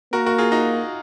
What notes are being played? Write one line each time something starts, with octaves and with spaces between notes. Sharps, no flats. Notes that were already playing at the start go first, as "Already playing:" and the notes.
A#3 F#4 A#4
F#4 A#4
F4 G#4
D#4 F#4